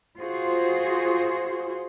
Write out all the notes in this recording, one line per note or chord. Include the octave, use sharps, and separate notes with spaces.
F4 F#4 G#4 C5